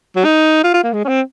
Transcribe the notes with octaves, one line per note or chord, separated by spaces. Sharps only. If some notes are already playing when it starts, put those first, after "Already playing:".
F#3
D#4
F4
F4
A#3
G#3
C#4
C4